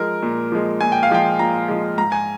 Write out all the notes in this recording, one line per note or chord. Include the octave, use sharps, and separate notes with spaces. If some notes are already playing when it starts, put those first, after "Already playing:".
Already playing: F3 G#3 A#4
A#2
F3 G#3
A#2 G#5
G5
F5
F3 G#3 G5
A#2 A#5
F3 G#3
G#2 A#5
G#5